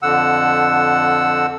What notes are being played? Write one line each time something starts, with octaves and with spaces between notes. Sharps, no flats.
F2 D3 F#5 E6